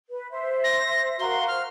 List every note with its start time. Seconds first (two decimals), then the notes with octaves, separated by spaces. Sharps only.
0.10 B4
0.30 C5 E5
0.64 A#6
1.19 F#4 A#4 F5 C6
1.48 C5 F6